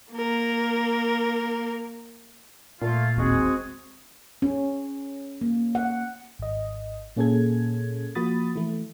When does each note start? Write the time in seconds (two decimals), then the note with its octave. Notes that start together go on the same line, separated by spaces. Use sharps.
0.13 A#3 A#4
2.82 A#2 A3 A#3 F4
3.17 E1 A1 D#2 G#3 C4 F#4 G#4
4.42 C#4
5.41 A#3
5.75 F#5
6.39 G#1 D#5
7.16 A#2 A#3 C#4 G#4 A4 G#6
8.15 F3 A#3 F#4 B5 D#6 A6
8.56 E3 A3